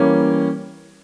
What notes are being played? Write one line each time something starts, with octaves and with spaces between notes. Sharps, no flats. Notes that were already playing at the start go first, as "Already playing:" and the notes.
Already playing: E3 G3 A#3 C#4